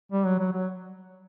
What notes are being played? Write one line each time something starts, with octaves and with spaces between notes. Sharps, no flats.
G3
F#3
F#3
F#3